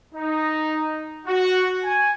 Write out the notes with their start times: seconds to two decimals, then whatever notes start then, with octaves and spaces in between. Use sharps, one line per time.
0.14 D#4
1.26 F#4
1.83 G#5